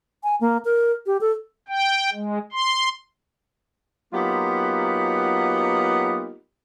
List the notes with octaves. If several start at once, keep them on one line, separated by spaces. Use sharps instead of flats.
G#5
A#3
A#4
G4
A4
G5
G#3
C6
F#3 A#3 B3 D#4 F4 G4